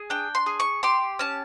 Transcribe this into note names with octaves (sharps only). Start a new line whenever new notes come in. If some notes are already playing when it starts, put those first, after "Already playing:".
Already playing: G#4
D4 G5
C6
G#4
C#6
G4 C6
C#4 A5